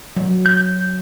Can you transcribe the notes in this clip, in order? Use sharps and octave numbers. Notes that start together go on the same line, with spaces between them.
F#3
G6